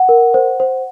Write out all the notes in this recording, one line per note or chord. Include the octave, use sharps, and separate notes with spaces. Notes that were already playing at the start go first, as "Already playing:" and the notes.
Already playing: F#5
A#4
C5
C5